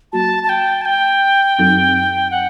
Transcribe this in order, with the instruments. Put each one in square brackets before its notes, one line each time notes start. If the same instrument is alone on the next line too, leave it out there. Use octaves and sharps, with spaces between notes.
[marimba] F#3 A#3 F#4 [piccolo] A5
[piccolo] A5
G5
A5
G5
[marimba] F#2 F#3 C4 D#4 A4
[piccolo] F#5